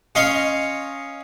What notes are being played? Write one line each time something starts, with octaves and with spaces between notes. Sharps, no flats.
C#4 D#5 F5 C6 C#6